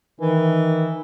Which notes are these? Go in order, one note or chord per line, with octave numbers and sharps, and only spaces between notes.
D#3 E3